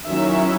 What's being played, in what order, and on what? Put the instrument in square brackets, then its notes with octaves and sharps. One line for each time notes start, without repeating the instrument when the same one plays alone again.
[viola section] D#3 F#3 C#4 E4 E5